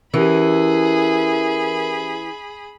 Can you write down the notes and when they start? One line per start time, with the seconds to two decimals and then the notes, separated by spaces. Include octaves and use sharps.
0.14 E3 C#4 E4 G4 G#4 A#4 B5